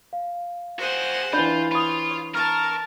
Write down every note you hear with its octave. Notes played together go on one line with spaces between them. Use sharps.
F5
F#4 G#4 C5 F#5
E3 D4 F4 B5 G6
F4 C#5 B5 D#6
A#4 A5 C#6 F6